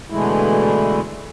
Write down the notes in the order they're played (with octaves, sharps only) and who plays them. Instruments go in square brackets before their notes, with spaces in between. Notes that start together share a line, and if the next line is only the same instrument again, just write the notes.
[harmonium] B2 D3 E3 G#3 A3 E4